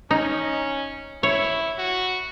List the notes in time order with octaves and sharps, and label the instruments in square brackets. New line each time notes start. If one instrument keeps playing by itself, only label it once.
[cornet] C#4 [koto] D#4
[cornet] E4 [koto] C#5
[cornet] F#4